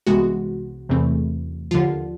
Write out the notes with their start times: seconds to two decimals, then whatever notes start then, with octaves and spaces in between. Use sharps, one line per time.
0.07 C2 C3 E3 G#3 B3 F#4
0.89 E2 C3 E3 A3 C4
1.71 D#2 D3 F3 F4